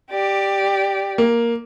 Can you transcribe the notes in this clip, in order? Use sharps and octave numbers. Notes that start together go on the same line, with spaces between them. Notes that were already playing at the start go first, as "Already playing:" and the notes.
G4 D5
A#3